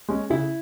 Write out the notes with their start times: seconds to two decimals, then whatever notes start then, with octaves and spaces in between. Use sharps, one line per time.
0.09 G#3 C#4
0.30 C#3 E4